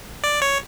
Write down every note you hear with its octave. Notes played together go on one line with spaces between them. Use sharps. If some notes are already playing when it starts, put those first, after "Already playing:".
D5
C#5